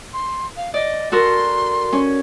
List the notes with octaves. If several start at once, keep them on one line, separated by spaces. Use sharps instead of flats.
C6
F5
D5 D#5
F#4 A4 A#4 C6
C#4